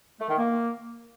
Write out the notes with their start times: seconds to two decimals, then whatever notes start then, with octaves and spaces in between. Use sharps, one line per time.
0.19 A3
0.29 D#3
0.38 A#3